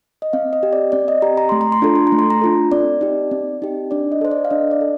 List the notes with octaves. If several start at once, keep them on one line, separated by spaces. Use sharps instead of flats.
D#5
C4 F5
D#5
G4
D5
C4 D5
D#5
G4 A#5
A#5
A3 C6
A#5
C6
D4 F4 A4 A#5
C6
A#5
A3
C6
A#5
D4 F4 A4
C4 D5
D#4 G4
C4
D#4 G4
D4 D5
D#5
A4 C5
D5
F5
D4 D#5
D5
A4